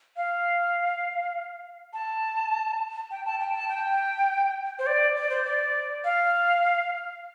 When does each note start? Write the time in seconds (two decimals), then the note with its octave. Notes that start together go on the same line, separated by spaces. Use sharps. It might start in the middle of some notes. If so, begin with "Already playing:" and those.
0.16 F5
1.93 A5
3.11 G5
3.25 A5
3.40 G5
3.55 A5
3.69 G5
4.79 C5
4.86 D5
5.16 D5
5.30 C5
5.44 D5
6.04 F5